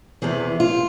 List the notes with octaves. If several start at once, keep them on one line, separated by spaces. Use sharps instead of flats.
E2 C3 E3 G#4
F4